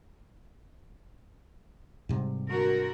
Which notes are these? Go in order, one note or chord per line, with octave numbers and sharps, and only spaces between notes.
G#2 C3 G3
D3 F#4 A#4